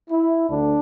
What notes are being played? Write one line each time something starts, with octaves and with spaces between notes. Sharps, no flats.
E4
D2 D3 D4